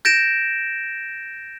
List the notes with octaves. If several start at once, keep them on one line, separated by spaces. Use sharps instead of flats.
G6 A6 A#6 D7 E7